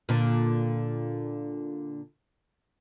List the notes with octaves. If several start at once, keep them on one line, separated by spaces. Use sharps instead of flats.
A#2 D3